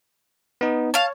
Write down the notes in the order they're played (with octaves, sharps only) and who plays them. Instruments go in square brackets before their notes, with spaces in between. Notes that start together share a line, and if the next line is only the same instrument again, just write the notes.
[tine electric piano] B3 D#4
[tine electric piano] C#5 [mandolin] F5 A5